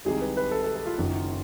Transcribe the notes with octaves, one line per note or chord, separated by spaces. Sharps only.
C2 C3 D#3 G#3 G#4
B4
B4
A4
A4
A4
F4
F#1 F#2 D#3 F#3